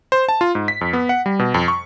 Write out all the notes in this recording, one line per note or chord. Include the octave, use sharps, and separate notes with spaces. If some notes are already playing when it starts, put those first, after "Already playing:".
C5
A5
F4
G#2
B6
F2
B3
F#5
G3
B2
F2
C#6